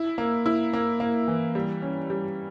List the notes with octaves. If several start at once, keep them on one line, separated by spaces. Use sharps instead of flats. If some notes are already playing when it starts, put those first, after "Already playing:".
Already playing: E4
A#3
E4
A#3
A#3
E3
G3
C#4
G3